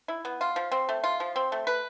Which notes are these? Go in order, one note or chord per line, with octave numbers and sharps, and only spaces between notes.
E4
B3
F4
F3
C4
A3
F4
F3
C4
A3
B4